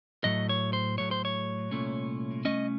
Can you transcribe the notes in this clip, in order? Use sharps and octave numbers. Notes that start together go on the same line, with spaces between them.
A2 F#3 A3 D#5
C#5
C5
A2 F#3 A3 C#5
C5
C#5
C2 A#2 A3 C#4
C2 A#2 A3 C#4 D#5